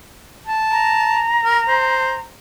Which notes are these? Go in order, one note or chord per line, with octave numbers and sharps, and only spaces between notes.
A5
A#5
A#4
C5